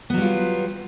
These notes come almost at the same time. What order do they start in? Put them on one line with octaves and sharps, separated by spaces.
B3 F#3 G3 F4